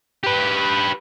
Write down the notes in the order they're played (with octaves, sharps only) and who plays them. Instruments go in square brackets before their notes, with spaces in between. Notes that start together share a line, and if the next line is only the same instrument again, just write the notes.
[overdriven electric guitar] G4 B4